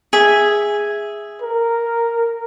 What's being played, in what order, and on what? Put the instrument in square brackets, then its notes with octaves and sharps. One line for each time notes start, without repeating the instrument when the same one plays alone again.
[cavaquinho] G#4 E5
[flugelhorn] A#4